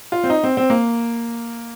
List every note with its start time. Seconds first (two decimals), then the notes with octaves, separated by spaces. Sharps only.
0.12 F4
0.24 C4
0.30 D#4
0.44 C4
0.57 C4
0.70 A#3